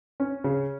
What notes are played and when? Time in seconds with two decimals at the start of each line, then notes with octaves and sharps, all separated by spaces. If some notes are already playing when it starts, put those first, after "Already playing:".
0.20 C#4
0.44 C#3